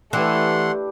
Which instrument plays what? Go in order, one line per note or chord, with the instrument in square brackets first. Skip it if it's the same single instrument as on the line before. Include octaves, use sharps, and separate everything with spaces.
[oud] E3 [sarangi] A3 [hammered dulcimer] D4 G4 B4 [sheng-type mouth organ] F#5 C6